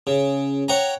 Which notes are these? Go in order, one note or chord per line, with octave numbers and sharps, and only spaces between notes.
C#3
C#5 F#5 G5 A#5